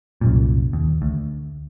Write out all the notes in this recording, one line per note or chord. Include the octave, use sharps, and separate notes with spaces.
C2 F#2 A#2
D#2
D2